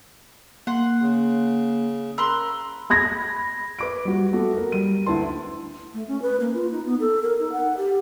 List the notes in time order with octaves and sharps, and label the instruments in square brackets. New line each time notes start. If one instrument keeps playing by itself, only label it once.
[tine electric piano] A#3 [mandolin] F#5 C6
[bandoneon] C#3
[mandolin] A#4 C6 F#6 [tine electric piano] B5 E6
[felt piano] B5 G#6 A#6
B4 D6 D7
G3 F#4
A3 B3 F#4
A#4
G3 D#7
D2 E4 B4 A5 C6
[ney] A3
C#4
B4
A#3
F4
D#4
B3
A4
A#4
D#4
F#5
G4